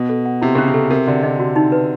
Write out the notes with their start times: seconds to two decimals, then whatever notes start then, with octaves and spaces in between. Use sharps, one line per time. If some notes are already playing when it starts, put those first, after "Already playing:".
Already playing: B2
0.09 A4
0.26 F#5
0.42 C3 E4
0.55 C#3 C#4
0.68 C3
0.74 A4
0.90 C3 A#4
1.07 D3 F#4
1.23 C3 D#5
1.39 F#4
1.56 D#4
1.72 B4